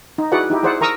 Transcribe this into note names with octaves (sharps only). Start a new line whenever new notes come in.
D#4
E4 F#4 G#4 B4 D5 F#5
D#4 E4 G4
E4 G#4 C5 D5 F#5
A#4 A#5 C#6 D#6 E6